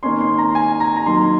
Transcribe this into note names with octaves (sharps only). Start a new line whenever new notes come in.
D#3 A#3 C#4 C6
C6
A#5
G#5
A#5
A#5
D#3 F#3 A#3 D#4 C6